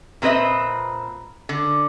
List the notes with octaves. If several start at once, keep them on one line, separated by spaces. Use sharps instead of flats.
A#2 C4 B4 D#5 E5
D3